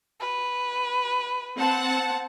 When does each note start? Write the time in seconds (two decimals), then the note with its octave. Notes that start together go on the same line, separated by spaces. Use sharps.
0.20 B4
1.58 C4 F#5 A5